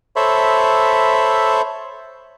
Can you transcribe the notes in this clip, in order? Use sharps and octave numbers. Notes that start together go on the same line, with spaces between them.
A4 C5 C#5 E5 B5